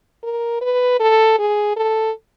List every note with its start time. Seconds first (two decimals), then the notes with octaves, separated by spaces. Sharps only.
0.23 A#4
0.61 B4
1.00 A4
1.39 G#4
1.76 A4